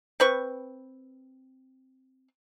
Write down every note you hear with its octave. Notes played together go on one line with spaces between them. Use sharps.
C4 B4 C#6